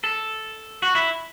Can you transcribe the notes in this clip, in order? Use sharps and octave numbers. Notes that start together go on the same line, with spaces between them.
A4
F#4
E4